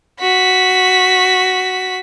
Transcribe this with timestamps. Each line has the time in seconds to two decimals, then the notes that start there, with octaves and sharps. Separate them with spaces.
0.21 F#4 B6